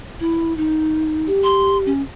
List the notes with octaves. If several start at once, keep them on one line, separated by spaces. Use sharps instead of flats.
E4
D#4
G4
C6
C#4